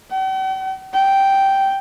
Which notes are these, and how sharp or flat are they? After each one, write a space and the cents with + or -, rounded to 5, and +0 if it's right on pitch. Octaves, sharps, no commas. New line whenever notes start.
G5 -45
G5 -5